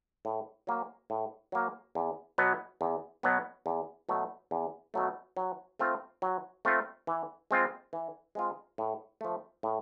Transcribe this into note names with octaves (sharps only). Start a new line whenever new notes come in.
A2
F#3 A#3
A2
F#3 A#3
E2
B2 F#3 B3
E2
B2 F#3 B3
E2
B2 F#3 A3
E2
B2 F#3 A3
F#3
A3 C4 F4
F#3
A3 C4 F4
E3
G#3 C4 F4
E3
G#3 C4 F4
A2
F3 A3
A2